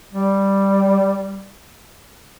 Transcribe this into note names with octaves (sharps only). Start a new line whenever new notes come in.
G3